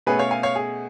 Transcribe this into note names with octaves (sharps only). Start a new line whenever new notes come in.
B2 A3 C#4 G#4 B4
C#5 F5
F5 G#5
C#5 F5
G#4